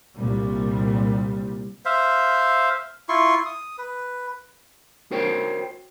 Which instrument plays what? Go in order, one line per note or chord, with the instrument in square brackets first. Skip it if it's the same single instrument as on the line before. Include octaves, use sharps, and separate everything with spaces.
[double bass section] C2 A#2 G3
[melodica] C5 E5 F5
E4 F4 C6 C#6
D#6
B4
[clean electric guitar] F#4 A#4 C5 C#5 G5